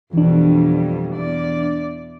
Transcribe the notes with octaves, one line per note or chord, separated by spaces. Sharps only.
F2 B2 E3 G3 D4
E2 D5